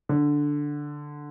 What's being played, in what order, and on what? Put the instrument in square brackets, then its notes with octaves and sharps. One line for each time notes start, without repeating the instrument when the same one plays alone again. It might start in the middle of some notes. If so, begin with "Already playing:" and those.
[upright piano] D3